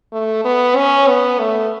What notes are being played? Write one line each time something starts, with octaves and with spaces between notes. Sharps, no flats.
A3
B3
C#4
B3
A3